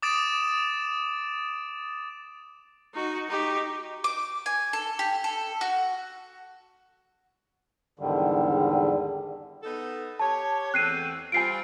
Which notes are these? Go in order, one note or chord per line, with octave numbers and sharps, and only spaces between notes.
D6 D#6 A6 D7 E7
D#4 F#4
D#4 G4
D6
G#5
A4
G4
A4
F#4
E2 G#2 D3 D#3 G3
B3 D#4 A4
G4 C#5 A5
E2 A3 C4 F#6 C7 D#7
G3 C4 F4 G#5 C7 D7